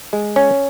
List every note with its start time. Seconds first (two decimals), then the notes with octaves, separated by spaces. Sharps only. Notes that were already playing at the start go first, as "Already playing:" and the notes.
0.13 G#3
0.36 C#4